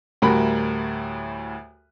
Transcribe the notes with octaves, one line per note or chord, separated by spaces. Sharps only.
D2 A2 G3 F#4 A#4 B5